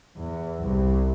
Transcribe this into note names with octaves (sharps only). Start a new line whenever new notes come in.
E2
C2